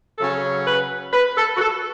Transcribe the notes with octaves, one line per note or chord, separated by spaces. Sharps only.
C#3 F#3 C#4 A4
B4
B4
A4
F#4
A4